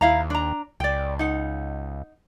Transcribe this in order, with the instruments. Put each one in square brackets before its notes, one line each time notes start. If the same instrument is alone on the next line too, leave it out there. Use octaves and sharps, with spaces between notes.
[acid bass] D#2 [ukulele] E4 F5 A#5
[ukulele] D4 A#5
[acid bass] C#2 [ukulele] D5 G5
[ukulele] D#4 F#5